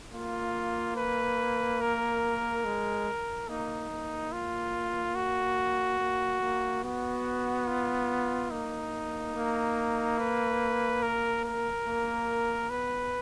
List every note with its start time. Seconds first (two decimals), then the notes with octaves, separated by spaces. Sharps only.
0.13 A#3 F4
0.96 B4
1.81 A#4
2.65 G#3
3.49 A#3 D#4
3.90 A#3
4.32 F4
5.15 F#4
6.00 A#3
6.42 A#3
6.84 B3 F#4
7.67 F4
8.51 A#3 D#4
9.35 A#3
10.19 B4
11.03 A#4
11.44 A#4
11.87 A#3
12.70 B3 B4